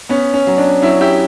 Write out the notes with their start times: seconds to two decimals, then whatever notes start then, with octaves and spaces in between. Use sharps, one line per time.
0.09 B3 C#4
0.34 C#4
0.47 F#3
0.58 D4
0.82 F#3 C#4 E4
1.01 E4 G4